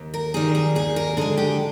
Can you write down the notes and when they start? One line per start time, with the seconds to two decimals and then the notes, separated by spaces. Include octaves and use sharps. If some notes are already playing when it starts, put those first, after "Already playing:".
Already playing: D#2
0.14 A#4
0.34 D#3 G3 G#4
0.55 G#4
0.75 D#2 G#4
0.96 A#4
1.17 D3 G#3 G#4
1.37 G4